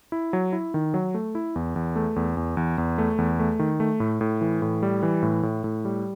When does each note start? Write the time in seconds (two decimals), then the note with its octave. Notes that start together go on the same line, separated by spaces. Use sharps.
0.12 E4
0.33 F#3
0.53 E4
0.74 D#3
0.94 F#3
1.14 A3
1.35 E4
1.56 E2
1.76 E2
1.96 A3
2.16 E2
2.37 E2
2.57 E2
2.78 E2
2.98 A3
3.18 E2
3.39 A3
3.59 D#3
3.80 A3
4.00 A2
4.21 A2
4.41 E3
4.62 A2
4.83 G3
5.03 E3
5.22 A2
5.43 A2
5.64 A2
5.85 G3